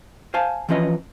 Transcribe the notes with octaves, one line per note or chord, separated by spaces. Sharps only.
C5 F5 G#5 A5
E3 F3 C#4 B4 D#5